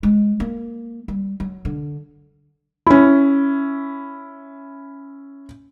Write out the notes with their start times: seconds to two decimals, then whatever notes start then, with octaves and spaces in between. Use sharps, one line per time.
0.03 G#3
0.40 A#3
1.08 G3
1.40 F#3
1.65 D3
2.87 C#4 E4